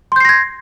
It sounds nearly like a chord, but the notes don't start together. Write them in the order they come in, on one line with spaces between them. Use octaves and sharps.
C6 G6 C7 A#6 G#6